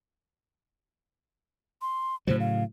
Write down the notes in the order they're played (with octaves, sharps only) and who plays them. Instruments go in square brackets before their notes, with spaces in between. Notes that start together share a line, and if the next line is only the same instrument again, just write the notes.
[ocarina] C6
[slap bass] A2 C#3 F#3 [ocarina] C5
[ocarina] F5